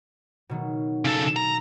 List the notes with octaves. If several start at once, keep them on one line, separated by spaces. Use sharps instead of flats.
B2 D#3 F#3
C#3 A4
A#5